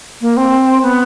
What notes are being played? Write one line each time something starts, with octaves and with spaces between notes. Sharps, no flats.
A#3
C4
B3